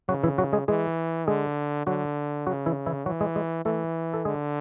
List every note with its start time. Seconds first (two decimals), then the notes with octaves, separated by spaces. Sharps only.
0.09 C#3 F#3 F#4
0.24 E3 E4
0.38 F#3 F#4
0.53 G#3 G#4
0.68 E3 G#3 G#4
1.28 D3 G#3 G#4
1.87 D3 F#3 F#4
2.47 C#3 F#3 F#4
2.66 E3 E4
2.86 E3 E4
3.06 E3 F#3 F#4
3.21 G#3 G#4
3.36 G#3 G#4
3.65 E3 A3 A4
4.14 A4
4.25 D3 G#3 G#4